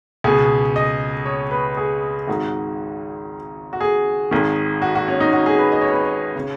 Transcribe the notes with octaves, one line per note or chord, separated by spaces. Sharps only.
C#2 B2 G#4
D#5
C#5
B4
G#4
G#1 G#2 D#3 F#4
F#4
G#4
G#1 G#2 D#3
F#4
F#4
C#4
D#4
F#4
G#4
B4
D#5
C#5
B4
C#5
C#3